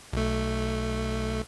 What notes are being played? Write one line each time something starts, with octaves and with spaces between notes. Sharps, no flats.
B1 A3